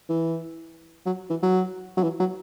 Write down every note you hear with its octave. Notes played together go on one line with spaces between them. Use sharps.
E3
F#3
E3
F#3
F#3
E3
F#3